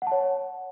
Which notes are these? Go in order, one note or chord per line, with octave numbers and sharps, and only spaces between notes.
C#5 F#5 A5